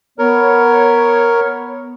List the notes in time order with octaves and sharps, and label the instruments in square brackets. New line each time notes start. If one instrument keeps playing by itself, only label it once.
[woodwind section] B3 C#5 [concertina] A#4